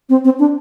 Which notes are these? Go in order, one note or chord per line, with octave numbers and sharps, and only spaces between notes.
C4
C4
D4